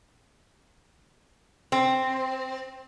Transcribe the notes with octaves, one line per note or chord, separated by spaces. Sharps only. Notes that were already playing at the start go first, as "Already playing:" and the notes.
C4